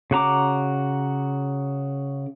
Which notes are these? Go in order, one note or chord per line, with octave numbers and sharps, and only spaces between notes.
C#3 F#4 A#5 D6